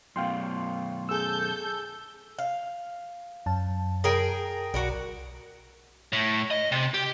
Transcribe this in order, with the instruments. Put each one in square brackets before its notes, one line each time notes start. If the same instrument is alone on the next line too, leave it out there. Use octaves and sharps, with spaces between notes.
[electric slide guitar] F#2 B2 [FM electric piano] F5 G5 C6
[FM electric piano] G#4 E6 [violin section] A4 G6
[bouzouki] F5
[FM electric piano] F#2 A5
[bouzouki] G#4 A#4 G5
[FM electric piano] B1 [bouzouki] F#4 A#4 D5
[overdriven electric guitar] A2
D#5
C3
G4